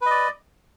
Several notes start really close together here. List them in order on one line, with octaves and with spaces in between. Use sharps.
B4 D#5 D5